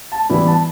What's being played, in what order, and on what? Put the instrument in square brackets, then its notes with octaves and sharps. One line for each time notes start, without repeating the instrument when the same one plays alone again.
[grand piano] A5
E3 G3 B3 E4
A5